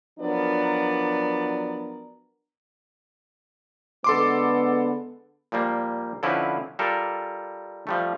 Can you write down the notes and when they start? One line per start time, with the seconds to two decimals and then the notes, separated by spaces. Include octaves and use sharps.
0.19 F3 F#3 B3 D4 A#4 D5
4.04 D3 G#3 B3 A4 C6 D6
5.52 A#2 F3 G3 A#3
6.23 D3 F3 C4 C#4 E4 B4
6.79 G3 F4 A4 A#4
7.87 F3 G3 A3